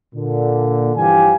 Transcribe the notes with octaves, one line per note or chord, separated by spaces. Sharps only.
A#2 D3
G2 E3 F3 G4 F5 G#5